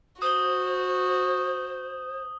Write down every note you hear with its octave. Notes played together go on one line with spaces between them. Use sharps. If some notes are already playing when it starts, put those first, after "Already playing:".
F#4 C5 D#6 G7